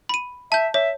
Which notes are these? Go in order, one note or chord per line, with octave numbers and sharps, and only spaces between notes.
B5 D#7
E5 A5 G6
C#5 E5